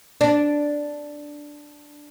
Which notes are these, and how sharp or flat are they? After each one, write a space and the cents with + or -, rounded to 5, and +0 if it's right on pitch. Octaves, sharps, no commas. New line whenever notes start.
D4 +0